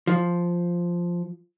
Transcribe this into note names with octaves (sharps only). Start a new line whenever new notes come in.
F3